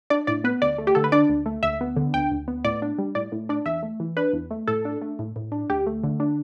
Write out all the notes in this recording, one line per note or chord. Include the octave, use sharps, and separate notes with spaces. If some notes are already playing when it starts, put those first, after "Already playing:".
D4 D5
A2 D5
B3 B4
D2 D5
A3
G4
D3 A4
B4
D4 D5
D2
A3
D2 E5
B3
D3
D2 G5
D2
B3
A2 D5
D4
G3
A2 D5
A2
D4 D5
E2 E5
A3
E3
D4 B4
E2
A3
A2 A4
D4
A3
A2
A2
D4
D2 G4
A3
D3
D4